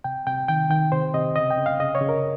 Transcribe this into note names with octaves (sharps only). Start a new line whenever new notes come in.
C3 G5
C3 G5
D#3 G5
D#3 G5
C3 C5
C3 D#5
C#3 D#5
G5
C#3
F5
C#3 D#5
C#5
C#3
A#4